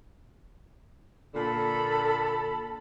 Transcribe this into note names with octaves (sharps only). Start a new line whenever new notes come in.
A#2 D3 A4 B5